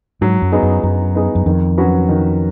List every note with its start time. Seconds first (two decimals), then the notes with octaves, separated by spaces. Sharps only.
0.21 G#2 F#3
0.42 F#2
0.52 B3 D#4 G#4
0.63 F#2
0.83 F#2 F#3
1.15 B3 D#4 G#4
1.35 F#2
1.46 F2 D#3
1.78 F#3 C#4 F#4 B4
2.08 D#3